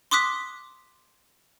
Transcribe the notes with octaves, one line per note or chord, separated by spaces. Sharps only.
C6 D6 D#6 F#6 B6